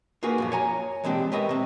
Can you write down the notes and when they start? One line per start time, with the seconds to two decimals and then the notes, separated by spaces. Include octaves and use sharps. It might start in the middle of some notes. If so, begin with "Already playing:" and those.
0.23 A#3 F4 F#4 G#4 B4
0.38 F#2 A#2 F3
0.52 C#5 G#5 A#5
1.04 E3 G#3 C4 D4 G4
1.32 G4 A#4 B4 C#5 D#5 E5
1.49 C3 C4